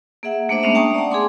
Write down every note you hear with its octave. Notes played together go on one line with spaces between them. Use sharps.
A#3 G#4 E5 F#5
A3 A#3 D4 C5 E5
G#3 A3 B3 C#4 D4 E5
G5 A5 A#5 C#6 D#6
D5 F#5
G#4 G#5 C6 D6